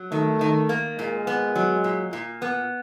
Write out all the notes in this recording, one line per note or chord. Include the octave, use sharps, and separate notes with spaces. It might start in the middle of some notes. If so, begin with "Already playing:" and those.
Already playing: F#3
D#3 A3
D#3
A#3
A#2 G#3
B3
F#3
A#2
A#2
B3